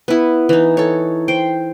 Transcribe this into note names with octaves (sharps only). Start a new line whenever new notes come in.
B3 E4
E3 D#4
A4 C#5
C5 G5